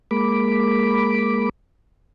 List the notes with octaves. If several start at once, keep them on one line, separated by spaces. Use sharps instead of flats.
G#3 A#3 B5 D6